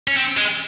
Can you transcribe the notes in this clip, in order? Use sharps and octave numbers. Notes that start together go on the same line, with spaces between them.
C#4
C4
G#3